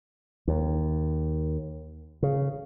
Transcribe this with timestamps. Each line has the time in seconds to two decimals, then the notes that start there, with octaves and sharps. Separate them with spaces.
0.48 D#2
2.23 C#3